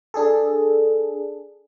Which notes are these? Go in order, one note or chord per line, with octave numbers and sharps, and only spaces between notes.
D4 G#4 A4